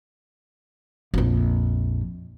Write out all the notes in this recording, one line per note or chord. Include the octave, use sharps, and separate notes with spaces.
A#1 F2